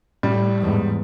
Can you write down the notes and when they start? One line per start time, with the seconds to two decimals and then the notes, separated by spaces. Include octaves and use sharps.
0.23 A2 G3
0.62 E2 G#2